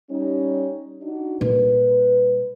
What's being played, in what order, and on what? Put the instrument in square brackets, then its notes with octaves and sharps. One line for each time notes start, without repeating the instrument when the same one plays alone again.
[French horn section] G3 C#4 D#4
D4 D#4 F#4
[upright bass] A#2 G3 [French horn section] B4